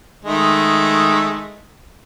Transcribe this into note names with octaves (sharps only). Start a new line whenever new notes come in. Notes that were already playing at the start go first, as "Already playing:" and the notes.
D#3 G#3 A3